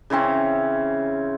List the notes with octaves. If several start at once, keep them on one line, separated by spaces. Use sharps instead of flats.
C#3 E3 C4 C#4